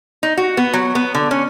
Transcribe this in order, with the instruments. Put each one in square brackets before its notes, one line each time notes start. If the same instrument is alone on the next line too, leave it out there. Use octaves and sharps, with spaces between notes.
[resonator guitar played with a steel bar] D#4
F#4
B3
F#3
B3
D3
C#4